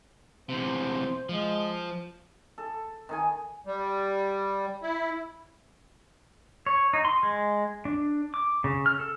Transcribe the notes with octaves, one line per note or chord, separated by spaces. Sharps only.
E2 C3 C5
F3 G#3
A4
D#3 D#4 G#5
G3
E4
C#5
D#4
C6
G#3
D4
D6
C#3
F6
A4